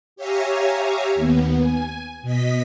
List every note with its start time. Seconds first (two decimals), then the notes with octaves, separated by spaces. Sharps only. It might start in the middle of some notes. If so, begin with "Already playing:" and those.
0.16 G4 C#5 E5 F5 G#5 A#5
1.15 D#2 B3
1.60 G#5
2.22 B2 D#5 B6